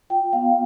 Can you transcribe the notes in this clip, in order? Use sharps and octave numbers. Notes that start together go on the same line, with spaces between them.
F4 G5
B3 F5